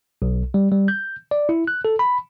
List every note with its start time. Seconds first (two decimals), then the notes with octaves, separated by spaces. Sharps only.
0.22 B1
0.54 G3
0.72 G3
0.88 G6
1.31 D5
1.49 E4
1.67 F#6
1.85 A4
1.99 B5